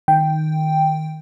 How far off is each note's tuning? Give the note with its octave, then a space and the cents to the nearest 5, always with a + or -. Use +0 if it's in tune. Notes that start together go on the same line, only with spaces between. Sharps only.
D#3 +0 G5 +0